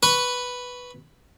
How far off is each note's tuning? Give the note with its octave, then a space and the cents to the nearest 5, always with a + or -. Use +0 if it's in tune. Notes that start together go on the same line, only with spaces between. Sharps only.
B4 +0 C#6 +0